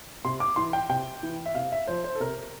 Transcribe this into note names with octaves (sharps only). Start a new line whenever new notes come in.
C3 C6
D6
E3 C6
G5
C3 G5
E3
E5
C3 F5
E5
F3 C5
C5
A4
C3 A#4